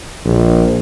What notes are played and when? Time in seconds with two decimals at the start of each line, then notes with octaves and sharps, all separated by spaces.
0.25 A#1